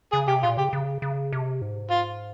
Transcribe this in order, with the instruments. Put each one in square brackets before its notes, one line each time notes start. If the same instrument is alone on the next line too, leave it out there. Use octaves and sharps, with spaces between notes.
[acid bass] C#3 [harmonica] G#4
[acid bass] C3 [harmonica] G4
[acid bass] A#2 [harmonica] F4
[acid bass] C#3 [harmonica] G4
[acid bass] C#3
C#3
C3
G#2
[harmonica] F4